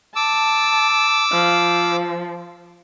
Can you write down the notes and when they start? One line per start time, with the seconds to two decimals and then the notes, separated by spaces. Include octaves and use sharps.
0.16 A5 D6 E6
1.32 F3